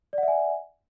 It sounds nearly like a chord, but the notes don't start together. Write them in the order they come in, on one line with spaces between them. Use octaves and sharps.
D5 F#5 E5 G#5